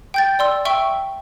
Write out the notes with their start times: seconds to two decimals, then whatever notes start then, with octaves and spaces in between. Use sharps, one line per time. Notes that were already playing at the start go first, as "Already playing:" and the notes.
0.14 G5 G6 A6
0.39 D5 C6 E6
0.65 E5 G5 C#6 E6 D7 G7